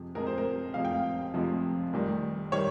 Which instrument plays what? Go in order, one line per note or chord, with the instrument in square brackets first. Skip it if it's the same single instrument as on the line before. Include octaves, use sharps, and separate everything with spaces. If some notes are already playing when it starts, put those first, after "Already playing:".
Already playing: [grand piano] F2 C3 F3 G#3
F1 F2 C3 F3 G#3 A#4
C5
A#4
F1 F2 C3 F3 G#3 F5
G5
F5
F1 F2 C3 F3 G#3
F1 F2 D#3 G3
D#3 G3 C#5